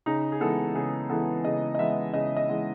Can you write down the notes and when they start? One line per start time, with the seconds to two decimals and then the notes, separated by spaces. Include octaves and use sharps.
0.06 C#3 D#4
0.32 G#4
0.41 E3 G#3 B3 A4
0.75 C#3 G#4
1.10 E3 G#3 B3 A4
1.45 C#3 D#5
1.75 D#5
1.79 E3 G#3 B3 E5
2.14 C#3 D#5
2.37 D#5
2.48 E3 G#3 B3